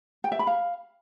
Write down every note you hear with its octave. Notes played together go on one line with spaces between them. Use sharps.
G5
E5
B5
F5